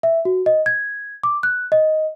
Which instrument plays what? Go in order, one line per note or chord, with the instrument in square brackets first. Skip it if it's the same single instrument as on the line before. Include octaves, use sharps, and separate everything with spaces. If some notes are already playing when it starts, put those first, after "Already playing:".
[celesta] E5
F#4
D#5
G#6
D6
F#6
D#5